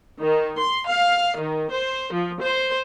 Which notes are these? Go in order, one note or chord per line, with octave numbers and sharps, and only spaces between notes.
D#3
C6
F5
D#3
C5
F3
C5